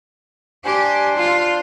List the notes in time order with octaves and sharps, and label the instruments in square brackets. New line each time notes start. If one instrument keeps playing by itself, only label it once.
[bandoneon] D4 C5 [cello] G4 [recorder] G#5
[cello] F4 [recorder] C6